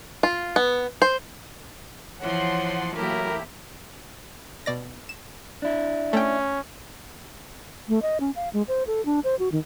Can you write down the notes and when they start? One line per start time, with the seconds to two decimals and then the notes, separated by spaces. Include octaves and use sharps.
0.23 F4
0.56 B3
1.02 C5
2.21 E3 F3 C#5 F#5 A5 C6
2.97 A2 F#3 A#3 E4 G4 A#4
4.66 B2 D5 A#6
5.09 E7
5.62 D4 E4
6.13 A3 C#4 G5
7.89 A3
8.02 D#5
8.20 C#4
8.36 F5
8.53 G#3
8.68 C5
8.87 A4
9.06 D4
9.24 C5
9.39 F#4
9.52 D#3